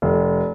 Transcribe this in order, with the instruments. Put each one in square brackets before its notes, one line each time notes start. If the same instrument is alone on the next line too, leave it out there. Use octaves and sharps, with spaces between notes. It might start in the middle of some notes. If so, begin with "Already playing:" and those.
[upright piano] F1